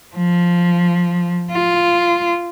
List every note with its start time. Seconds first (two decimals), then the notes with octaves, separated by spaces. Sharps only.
0.16 F3
1.52 F4